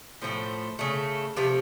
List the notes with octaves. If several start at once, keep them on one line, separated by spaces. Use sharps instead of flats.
A2 F3 A3 C5
C#3 A3
C3 F3 A3